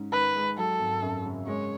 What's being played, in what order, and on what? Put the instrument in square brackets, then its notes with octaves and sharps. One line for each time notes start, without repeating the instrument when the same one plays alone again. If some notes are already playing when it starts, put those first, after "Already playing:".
Already playing: [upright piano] G#2 C#4
[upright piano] D#3 [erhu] B4
[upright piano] G#3
[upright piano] F#3 [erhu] A4
[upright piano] G#1
F#2
C#3
[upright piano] G#3 [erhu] C#5